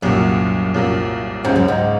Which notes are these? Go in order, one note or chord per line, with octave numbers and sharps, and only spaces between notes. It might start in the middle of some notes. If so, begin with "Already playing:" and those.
C2 F#2 A#2 F#3 A#3
C2 A#2 F#3 A#3
C#2 G#2 C#3 F#3 C4 F#4
F#2
G#2